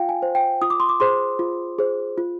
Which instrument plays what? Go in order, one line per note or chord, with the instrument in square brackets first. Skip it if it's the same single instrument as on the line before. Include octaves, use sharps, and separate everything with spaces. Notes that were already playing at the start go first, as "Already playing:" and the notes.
Already playing: [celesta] F4 F5 G5
G#5
C5
G5
F4 D#6
D6
C6
D6
G#4 C5 C6
F4
G#4 C5
F4